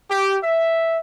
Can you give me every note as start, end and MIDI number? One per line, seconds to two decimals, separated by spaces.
0.10 0.37 67
0.44 0.98 76